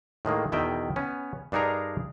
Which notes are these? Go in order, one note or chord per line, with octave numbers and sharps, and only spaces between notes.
A2 D#3 G#3 A#3
E2 B2 D#3 E5 G5
B3 C#4
G2 D4 D#4 G#4 A#4 A#5